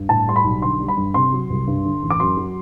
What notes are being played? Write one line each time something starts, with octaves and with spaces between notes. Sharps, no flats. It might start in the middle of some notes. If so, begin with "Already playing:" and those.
Already playing: G2
A2 A5
G3 C6
B5
B1
D3 C6
G3
B5
G2
C3 C6
F#3
C2
G2
D3
A1
D6
F#2 C6
F#3